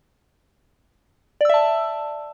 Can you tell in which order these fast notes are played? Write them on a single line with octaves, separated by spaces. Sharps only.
D5 E6 E5 A5